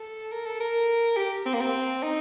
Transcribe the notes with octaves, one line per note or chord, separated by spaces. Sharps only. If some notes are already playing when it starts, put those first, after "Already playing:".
Already playing: A4
A#4
A4
A#4
G4
C4
A#3
C4
D#4